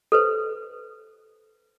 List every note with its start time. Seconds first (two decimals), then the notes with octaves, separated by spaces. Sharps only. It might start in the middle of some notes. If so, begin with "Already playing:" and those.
0.12 A4 B4 C5